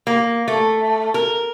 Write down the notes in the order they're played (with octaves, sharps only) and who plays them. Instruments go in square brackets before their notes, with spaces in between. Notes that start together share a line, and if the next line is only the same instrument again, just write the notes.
[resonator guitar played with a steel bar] A#3
A3
A#4